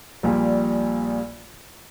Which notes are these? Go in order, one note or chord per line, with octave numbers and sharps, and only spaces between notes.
A#1 A#2 G3